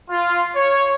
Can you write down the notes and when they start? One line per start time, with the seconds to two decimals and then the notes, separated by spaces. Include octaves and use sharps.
0.10 F4
0.56 C#5